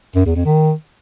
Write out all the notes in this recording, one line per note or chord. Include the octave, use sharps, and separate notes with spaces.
F#2
E2
F2
D#3